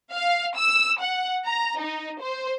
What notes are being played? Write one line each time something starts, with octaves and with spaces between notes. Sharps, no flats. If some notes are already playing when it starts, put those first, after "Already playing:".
F5
E6
F#5
A#5
D#4
C5